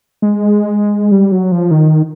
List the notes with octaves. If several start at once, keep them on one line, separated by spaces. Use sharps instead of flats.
G#3
G3
F#3
F3
D#3